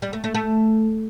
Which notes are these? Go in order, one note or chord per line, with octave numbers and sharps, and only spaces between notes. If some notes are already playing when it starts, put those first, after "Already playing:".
G3
A3
A3
A3